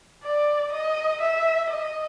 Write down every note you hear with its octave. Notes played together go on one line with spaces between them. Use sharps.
D5
D#5
E5
D#5